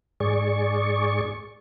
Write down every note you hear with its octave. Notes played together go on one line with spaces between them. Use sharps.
G#2 G#4 D5 C#6